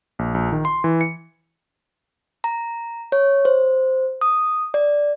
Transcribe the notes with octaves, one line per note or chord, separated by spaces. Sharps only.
A#1
A#1
D#3
C6
E3
C#7
A#5
C#5
C5
D#6
D5